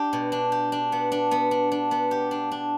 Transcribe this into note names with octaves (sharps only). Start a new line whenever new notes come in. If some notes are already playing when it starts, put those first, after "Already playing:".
Already playing: D4 G4
B2
D4
G4
D4
B3
D4
B3
D4
D4
B3
G4
D4
D4